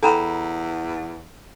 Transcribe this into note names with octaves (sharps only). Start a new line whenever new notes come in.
E2 A4 G5 G#5 A#5 B5